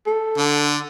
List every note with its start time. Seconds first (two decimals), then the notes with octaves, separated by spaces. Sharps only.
0.07 A4
0.37 D3